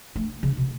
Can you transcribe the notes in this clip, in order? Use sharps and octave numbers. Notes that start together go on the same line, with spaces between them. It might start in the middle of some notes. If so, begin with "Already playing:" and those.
A3
C#3
B2